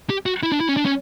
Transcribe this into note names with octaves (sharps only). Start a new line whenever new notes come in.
G4
F#4
E4
D4
E4
C#4
D4
C#4